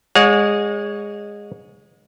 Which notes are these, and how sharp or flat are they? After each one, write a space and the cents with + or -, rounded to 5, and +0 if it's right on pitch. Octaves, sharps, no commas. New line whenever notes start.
G#3 -15 C#5 +15 F#5 -45